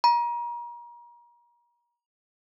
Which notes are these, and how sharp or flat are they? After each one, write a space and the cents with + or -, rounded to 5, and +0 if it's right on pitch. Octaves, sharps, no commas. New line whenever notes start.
A#5 +35